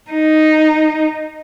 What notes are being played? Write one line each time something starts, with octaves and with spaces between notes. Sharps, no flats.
D#4